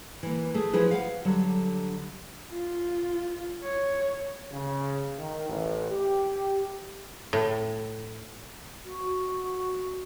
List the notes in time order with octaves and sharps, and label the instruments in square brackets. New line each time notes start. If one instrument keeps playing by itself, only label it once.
[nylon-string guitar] E3 A#3
A3 G#4
F3 E4 G#4 B4
F5 F#5
D3 F#3 G3
[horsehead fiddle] F4
C#5
[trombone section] C#3
D#3
A1
G4
[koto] A2
[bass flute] F#4